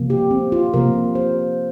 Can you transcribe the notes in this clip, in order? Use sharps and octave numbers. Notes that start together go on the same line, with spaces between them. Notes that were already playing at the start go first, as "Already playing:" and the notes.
Already playing: C3 F3 A#3
G4
C4
F4
C3 F3 A#3 A#4
C5